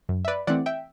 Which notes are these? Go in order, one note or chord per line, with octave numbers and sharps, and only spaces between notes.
F#2
E5
B4 D5
E3 A3 C4 D5 F#5
E5 G5